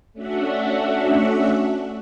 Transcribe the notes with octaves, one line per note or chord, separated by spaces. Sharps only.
A3 C#4 D4 F#4 E5 F#5